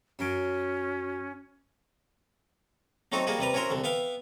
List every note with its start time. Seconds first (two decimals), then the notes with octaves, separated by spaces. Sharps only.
0.19 F#2 F#3 C#4 D6
3.12 F#3 A3 C4 D#4 F#4
3.27 G3 A#3 F#4 G#4
3.39 C3 G3 B4 A#5
3.54 C#4 E4 F#4 A#4 C5
3.71 C2 D3
3.84 B3 E5 F5 G5